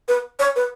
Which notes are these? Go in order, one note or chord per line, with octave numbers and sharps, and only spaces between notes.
B4
C#5
B4